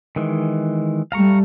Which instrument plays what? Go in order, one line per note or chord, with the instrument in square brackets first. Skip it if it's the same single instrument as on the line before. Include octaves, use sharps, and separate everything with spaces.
[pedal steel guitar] D#3 E3 G#3
[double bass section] G3 A3 [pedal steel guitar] F5 A#5 C#6